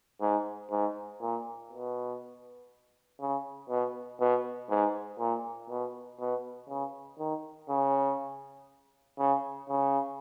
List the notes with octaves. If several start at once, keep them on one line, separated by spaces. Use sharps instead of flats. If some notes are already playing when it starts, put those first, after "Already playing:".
G#2
G#2
A#2
B2
C#3
B2
B2
G#2
A#2
B2
B2
C#3
D#3
C#3
C#3
C#3